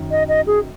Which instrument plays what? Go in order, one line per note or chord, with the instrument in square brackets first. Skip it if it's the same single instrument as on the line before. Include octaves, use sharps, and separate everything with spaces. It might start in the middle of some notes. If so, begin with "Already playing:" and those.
Already playing: [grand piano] F#2 D#3
[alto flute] D#5
D#5
G#4